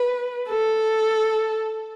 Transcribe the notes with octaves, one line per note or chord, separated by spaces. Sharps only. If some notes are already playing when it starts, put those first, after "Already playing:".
Already playing: B4
A4